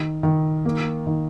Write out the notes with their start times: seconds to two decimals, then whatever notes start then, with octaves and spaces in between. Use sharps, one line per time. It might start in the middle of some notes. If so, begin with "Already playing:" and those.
Already playing: D#3
0.23 D#3
0.65 A#3
1.07 D#3